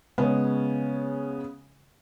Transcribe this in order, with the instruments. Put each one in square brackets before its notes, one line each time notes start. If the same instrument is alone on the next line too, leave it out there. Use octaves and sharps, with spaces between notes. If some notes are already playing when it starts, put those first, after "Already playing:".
[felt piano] C#3 G#3 B3 C#4